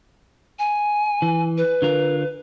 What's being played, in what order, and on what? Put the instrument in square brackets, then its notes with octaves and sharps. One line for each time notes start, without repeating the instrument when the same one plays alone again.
[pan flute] G#5
[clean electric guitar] E3
[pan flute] B4
[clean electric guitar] D3 F4 A#4